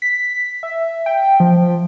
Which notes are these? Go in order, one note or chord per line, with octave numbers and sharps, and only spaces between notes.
B6
E5
G5
F3